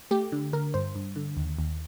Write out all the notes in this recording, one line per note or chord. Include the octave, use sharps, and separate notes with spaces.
A3 G4
D3
D3 A#4
G2 C5
G2
D3
D#2
D#2